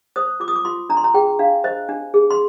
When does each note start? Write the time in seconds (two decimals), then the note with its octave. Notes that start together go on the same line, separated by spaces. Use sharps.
0.16 C5 D#6
0.40 F4 D6
0.48 D#6
0.56 D6
0.65 F4 C6
0.89 D4 A#5
0.97 C6
1.04 A#5
1.14 G#4 G5
1.39 D4 F5
1.64 C5 D#5
1.89 D4
2.14 G#4
2.31 C6